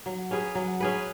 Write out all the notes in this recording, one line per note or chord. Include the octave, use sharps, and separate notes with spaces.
F#3
C#4 G#4 B4
F#3
C#4 G#4 B4